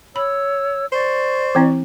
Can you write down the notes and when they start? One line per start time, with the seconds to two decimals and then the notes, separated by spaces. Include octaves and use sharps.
0.16 C#5 B5 E6
0.92 C5 D5 C#6
1.55 E3 C4 E4